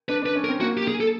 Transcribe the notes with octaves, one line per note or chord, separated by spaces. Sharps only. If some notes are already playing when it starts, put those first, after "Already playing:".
D4 B4
D4 B4
C#4
A#4
C4
A#3 F#4
G4
G#4
A4